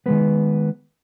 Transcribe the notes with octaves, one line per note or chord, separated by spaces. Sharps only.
D#3 G#3 B3 B4